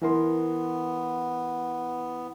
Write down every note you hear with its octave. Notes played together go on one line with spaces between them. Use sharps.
E3 B3 A#4 C6